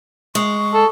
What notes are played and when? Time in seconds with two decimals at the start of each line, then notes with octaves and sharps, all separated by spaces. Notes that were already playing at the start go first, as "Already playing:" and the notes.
0.35 G#3 C#6
0.74 A4